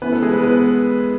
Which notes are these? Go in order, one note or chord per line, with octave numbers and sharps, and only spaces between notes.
E3 A3 B3 C#4 B4
A4
G#3 G#4
B3 B4
B3 B4